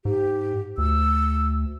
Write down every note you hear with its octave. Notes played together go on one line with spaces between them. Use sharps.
G#2 G4
D2 E6